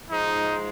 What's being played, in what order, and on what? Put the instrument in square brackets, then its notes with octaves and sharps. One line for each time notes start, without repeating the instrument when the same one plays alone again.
[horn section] G#2 F3 G#3 D#4